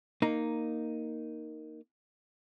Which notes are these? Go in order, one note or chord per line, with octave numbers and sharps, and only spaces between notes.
A#3 D#4